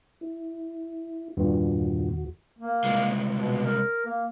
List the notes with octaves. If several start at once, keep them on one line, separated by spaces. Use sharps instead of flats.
E4
E2 G2 A#2 D#3 F#4
A#3
C2 G#3
B2
A#4
A#3